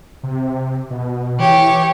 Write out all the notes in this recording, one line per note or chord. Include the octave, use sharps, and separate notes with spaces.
C3
B2
E3 G4 C#5